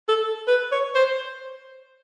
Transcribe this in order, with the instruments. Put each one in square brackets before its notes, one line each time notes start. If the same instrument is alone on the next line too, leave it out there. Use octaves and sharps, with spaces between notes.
[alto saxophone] A4
B4
C#5
C5